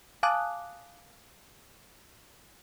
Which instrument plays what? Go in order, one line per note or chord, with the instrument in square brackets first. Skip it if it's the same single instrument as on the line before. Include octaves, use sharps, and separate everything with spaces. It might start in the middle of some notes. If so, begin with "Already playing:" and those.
[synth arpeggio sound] F5 G#5 A5 D6 D#6 F#6